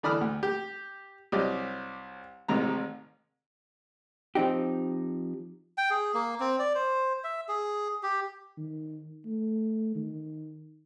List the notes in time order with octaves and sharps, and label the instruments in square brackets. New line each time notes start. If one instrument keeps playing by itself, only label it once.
[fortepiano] D3 E3 D5 B5 D#6 F6
D2
G4
C2 F#3 G4 D5 D#5
A1 G#2 C3 D#3 A#5
[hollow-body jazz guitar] F3 C4 D#4 G4
[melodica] G5
G#4
A#3
C4
D5
C5
E5
G#4
G4
[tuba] D#3
A3
D#3